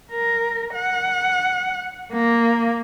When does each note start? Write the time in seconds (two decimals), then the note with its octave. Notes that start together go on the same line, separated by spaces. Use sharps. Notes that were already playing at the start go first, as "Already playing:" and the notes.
0.13 A#4
0.75 F#5
2.13 A#3